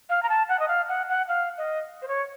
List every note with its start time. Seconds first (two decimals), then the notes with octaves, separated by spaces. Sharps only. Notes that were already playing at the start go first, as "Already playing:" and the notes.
0.09 F5
0.23 A#5
0.29 A5
0.49 F#5
0.60 D#5
0.68 F5
0.89 F#5
1.08 F#5
1.28 F5
1.58 D#5
2.02 C5
2.08 C#5